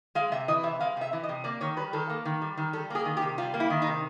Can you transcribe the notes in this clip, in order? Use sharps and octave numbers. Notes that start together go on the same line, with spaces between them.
G#3 F5
C3 E5
E3 D#5
C3 E5
G#3 F5
C3 E5
E3
D#5
C3
A#3 D5
D#3 C#5
G3 B4
D#3 A4
A#3
D#3
G3
D#3
G3 A4
A#3 G#4
D#3
G4
C3
G3 F4
A#3
E4
D#3
D#4
C3